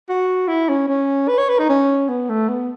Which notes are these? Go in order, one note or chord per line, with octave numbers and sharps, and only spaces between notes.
F#4
E4
C#4
C#4
B4
C#5
B4
D#4
C#4
B3
A3
B3